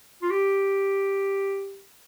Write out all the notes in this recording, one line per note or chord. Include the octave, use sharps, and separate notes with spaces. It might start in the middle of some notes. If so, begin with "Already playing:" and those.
F4
G4